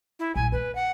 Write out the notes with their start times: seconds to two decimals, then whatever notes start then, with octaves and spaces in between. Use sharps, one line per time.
0.19 E4
0.36 A#1 G2 G#5
0.52 A#3 D4 B4
0.75 F#5